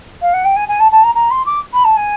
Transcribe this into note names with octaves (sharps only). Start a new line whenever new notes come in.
F5
F#5
G5
G#5
G#5
A5
A5
A#5
A#5
C6
D6
B5
A5
G#5